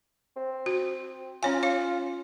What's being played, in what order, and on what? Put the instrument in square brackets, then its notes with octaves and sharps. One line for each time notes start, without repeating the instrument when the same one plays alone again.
[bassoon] C4
[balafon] F#4
[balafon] C#4 C#5 G#5 [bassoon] F4
[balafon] C#5 F5